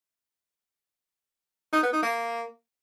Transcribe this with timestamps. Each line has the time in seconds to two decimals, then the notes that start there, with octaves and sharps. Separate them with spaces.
1.73 D#4
1.83 B3
1.93 D#4
2.03 A#3